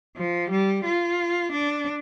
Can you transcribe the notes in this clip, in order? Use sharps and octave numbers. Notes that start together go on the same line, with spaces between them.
F3
G3
F4
D4